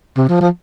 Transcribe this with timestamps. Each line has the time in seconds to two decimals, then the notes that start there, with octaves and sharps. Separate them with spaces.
0.17 C3
0.29 F3
0.41 F3